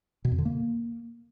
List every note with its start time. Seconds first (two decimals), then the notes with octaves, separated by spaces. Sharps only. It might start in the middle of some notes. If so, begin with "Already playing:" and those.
0.25 B2
0.32 F2
0.38 D3
0.45 A#3